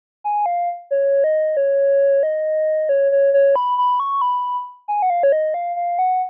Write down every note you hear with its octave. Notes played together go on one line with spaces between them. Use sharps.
G#5
F5
C#5
D#5
C#5
D#5
C#5
C#5
C#5
B5
B5
C#6
B5
G#5
F#5
F5
C#5
D#5
F5
F5
F#5